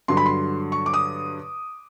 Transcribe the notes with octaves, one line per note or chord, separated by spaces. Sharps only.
G2 D3 F#3 C6
B5
C6
C#6
D6
D#6